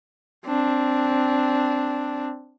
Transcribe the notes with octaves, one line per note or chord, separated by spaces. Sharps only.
C4 D4